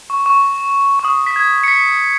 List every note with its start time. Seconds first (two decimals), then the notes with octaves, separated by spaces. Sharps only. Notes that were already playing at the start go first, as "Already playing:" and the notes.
0.10 C#6
0.26 C#6
0.99 C#6
1.04 D#6
1.27 B6
1.36 G#6
1.64 C#7
1.68 B6